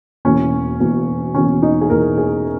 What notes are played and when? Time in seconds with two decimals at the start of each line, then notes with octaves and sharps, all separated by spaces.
0.25 E1 E2 B2 A#3 C#4
0.80 E1 E2 B2 A#3
1.35 E1 E2 B2 A#3 C#4
1.62 D#4
1.81 G#4
1.90 E1 E2 B2 A#3 A#4
2.18 G#4